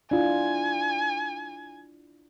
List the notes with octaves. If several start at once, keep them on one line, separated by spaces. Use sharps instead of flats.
D4 E4 F4 G#5